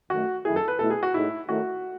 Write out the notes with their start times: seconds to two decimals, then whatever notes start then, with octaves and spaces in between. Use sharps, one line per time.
0.10 F#2 D#3 A3 F#4
0.45 F#2 D#3 A3 E4 G#4
0.56 A4
0.68 B4
0.79 B2 A3 E4 A4
0.90 G#4
1.03 F#4
1.14 A2 G#3 D#4 E4
1.48 D#3 A3 C#4 E4 F#4